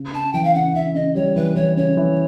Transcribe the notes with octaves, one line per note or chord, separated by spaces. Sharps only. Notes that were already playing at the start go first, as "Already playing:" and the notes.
Already playing: C#3
C#3 A5
E3 G5
F5
C#3 F#5
C#3 E5
C#3 D#5
G3 C#5
E3 B4
E3 C#5
C#3 C#5
E3